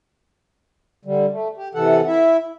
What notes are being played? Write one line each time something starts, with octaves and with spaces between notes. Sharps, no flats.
D3 G3
A3
G4
C3 E3 A4 F#5
E4 E5